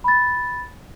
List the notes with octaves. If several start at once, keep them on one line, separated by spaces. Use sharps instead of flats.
B5 A6